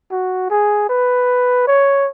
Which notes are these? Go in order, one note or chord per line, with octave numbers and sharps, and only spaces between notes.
F#4
G#4
B4
C#5